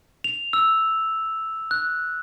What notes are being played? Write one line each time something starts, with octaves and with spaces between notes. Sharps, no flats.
F7
E6
F#6